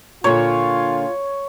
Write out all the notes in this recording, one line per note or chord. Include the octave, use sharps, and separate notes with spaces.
A#2 D3 F4 C#5